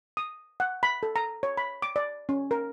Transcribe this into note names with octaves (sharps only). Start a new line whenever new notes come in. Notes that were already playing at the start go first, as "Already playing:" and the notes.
D#6
F#5
B5
A4
A#5
C#5
B5
D6
D5
C#4
A#4